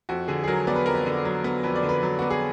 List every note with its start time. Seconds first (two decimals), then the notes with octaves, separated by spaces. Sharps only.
0.09 F2 F#4
0.28 D3 G#4
0.44 G#4
0.47 F#3 A#4
0.67 B3 D5
0.76 B4
0.86 F2 A#4
0.94 B4
1.06 D3
1.25 F#3
1.44 B3
1.64 F2 B4
1.76 D5
1.83 D3
1.89 B4
2.03 F#3
2.19 B3 F#4
2.30 G#4